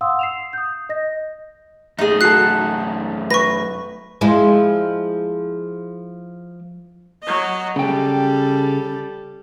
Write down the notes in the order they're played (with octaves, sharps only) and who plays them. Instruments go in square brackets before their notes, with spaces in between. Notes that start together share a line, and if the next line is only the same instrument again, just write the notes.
[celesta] F5 F#5 C6 D#6 E6
C7 E7 F7
D#6 G6
D#5 A#6
[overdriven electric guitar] F#2 A3 [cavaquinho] D#4 G#4
[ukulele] F#4 A4 [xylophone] F#6 C7
[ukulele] B4 [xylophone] C#6 A#6
[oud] F3 G#3 E4
[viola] F#3 D#5
[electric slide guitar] C#3 G5 [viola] G3 A4